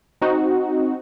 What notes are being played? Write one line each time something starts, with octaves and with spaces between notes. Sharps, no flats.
C4 D#4 F#4